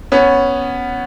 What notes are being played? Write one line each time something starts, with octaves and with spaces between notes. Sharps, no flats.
B3 C#4